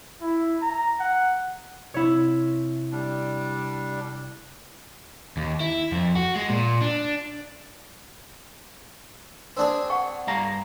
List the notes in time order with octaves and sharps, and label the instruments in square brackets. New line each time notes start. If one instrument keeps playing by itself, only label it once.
[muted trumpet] E4
A#5
F#5
[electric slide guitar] C3 [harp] E4 C#5
[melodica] G3 D4
[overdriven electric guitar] D#2
E4
F2
F#4
G#3
A#2
D4
[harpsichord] C4 D4 G#4
[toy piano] F#5 G5 C#6
[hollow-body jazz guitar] G2 F5 A#5